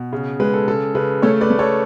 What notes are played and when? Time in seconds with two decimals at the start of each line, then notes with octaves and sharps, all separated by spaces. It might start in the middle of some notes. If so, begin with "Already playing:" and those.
Already playing: B2
0.13 C#3
0.40 G#3 B4
0.54 A4
0.68 C#3 A4
0.95 C#3 B4
1.22 A3 A4 C#5
1.41 B4 D5
1.50 A3
1.59 A4 C#5